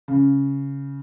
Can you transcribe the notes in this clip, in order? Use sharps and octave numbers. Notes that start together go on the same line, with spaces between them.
C#3